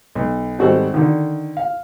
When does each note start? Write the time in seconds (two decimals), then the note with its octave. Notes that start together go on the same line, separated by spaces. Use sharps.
0.15 B1
0.59 G#1 G3 F#4 G4 A4 C5
0.94 D3 D#3
1.57 F5